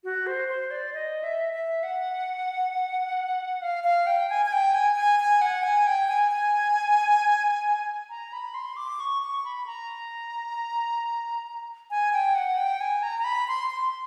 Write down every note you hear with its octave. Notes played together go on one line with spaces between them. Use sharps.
F#4
C5
C5
D5
D#5
E5
E5
F#5
F5
F5
G5
G#5
G#5
G5
G#5
G#5
G#5
F#5
G#5
G5
G#5
G#5
A#5
B5
C6
D6
C#6
C#6
B5
A#5
G#5
G5
F#5
G5
G#5
A#5
A#5
B5
C6
C6